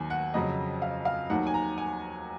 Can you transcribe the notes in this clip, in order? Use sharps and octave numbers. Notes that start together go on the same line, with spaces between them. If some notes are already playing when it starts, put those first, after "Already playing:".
Already playing: D#2 D#3 F#3 G#5
F#5
F2 C#3 F#3 D#5
F5
F5
D#2 D#3 F#3 F#5
G#5
A#5
G#5